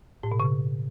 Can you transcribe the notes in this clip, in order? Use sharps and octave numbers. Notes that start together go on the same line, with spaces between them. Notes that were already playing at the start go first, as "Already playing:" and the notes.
A2
B2
C#3